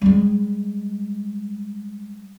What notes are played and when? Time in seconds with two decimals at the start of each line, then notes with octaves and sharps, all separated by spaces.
0.01 G3 G#3